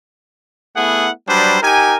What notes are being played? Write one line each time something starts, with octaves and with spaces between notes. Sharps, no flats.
A3 B3 E4 G#4 F#5
F#3 G3 D4 B4 C5
D#4 G4 A#4 G#5